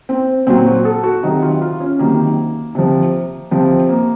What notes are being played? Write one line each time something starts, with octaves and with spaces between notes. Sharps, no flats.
C4
A#2 F#3 C4
F#4
A4
F#4
C3 D#3 F#3 D#4
F4
F4
C#4
C3 D#3 F#3 A#3
C3 F3
C3 F3 C4
A#3